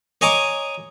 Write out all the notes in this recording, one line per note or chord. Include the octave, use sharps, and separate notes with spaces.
C#5 D#5 G#5 A#5 C#6 D6